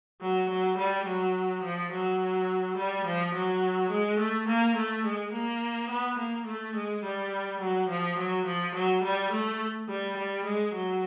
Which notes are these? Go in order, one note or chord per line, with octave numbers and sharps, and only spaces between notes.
F#3
F#3
G3
F#3
F3
F#3
G3
F3
F#3
G#3
A3
A#3
A3
G#3
A#3
B3
A#3
A3
G#3
G3
F#3
F3
F#3
F3
F#3
G3
A3
G3
G3
G#3
F#3